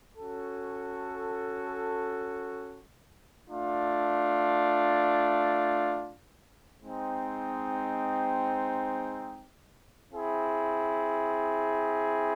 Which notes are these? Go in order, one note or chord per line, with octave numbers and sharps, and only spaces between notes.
C#4 F#4 A4
A3 D4 F4
G#3 C4 D#4
C4 E4 G#4